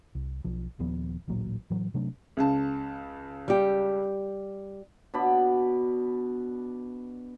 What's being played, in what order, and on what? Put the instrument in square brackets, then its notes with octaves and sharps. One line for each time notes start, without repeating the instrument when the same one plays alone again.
[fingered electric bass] C2
B1 F3
D#1 D#2 F3 B3
D1 A1 A#2 F#3
A2 E3 F#3
C3 F#3 A3 D4
[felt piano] C#2 C#3 A5
[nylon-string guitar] G3 G4
[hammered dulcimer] B2 D4 D5 B5